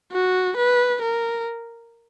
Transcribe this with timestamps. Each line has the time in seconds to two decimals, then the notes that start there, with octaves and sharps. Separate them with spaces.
0.12 F#4
0.57 B4
1.02 A#4